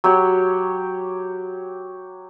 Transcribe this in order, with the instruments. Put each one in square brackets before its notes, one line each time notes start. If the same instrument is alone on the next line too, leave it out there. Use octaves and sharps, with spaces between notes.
[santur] F#3 G4 C#5